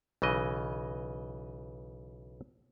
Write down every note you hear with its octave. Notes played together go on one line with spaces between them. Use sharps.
B1 C#3 E3 D#5